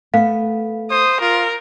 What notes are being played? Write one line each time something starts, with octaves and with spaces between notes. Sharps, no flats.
A3 B3 F5
C5 D#6
F4 A#4